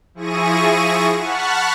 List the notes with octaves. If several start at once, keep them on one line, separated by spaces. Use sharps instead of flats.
F3 E4 G#4 C#6 A#6 D#7
F#5 A5 B5 C#6 F6 F#6